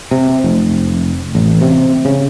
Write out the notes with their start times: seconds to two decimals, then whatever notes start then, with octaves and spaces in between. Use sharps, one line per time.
0.11 C3
0.44 F1
1.35 A1
1.61 C3
2.05 C#3